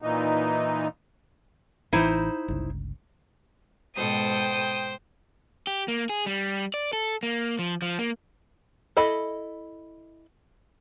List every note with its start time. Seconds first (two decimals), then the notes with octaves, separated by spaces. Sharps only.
0.02 A#2 E3 D#4
1.93 A1 E3 D#4 E4 C5
2.48 G1 C#2
3.96 G#2 B2 A4 C5 G5 D#6
5.67 G4
5.88 A#3
6.09 G#4
6.26 G3
6.74 D5
6.93 A4
7.23 A#3
7.59 F3
7.82 F3
7.99 A#3
8.97 E4 A4 D#5 B5